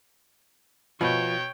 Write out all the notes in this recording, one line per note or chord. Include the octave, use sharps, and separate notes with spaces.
B2 F3 B3 F4 C#5 G5